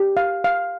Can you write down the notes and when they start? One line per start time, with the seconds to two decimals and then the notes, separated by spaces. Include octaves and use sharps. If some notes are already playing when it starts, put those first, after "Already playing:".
Already playing: G4
0.17 F5
0.44 F5